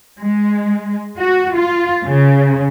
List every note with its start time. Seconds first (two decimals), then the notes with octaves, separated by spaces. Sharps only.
0.21 G#3
1.20 F#4
1.54 F4
2.06 C#3